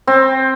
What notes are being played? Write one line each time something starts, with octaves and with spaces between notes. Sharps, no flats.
C4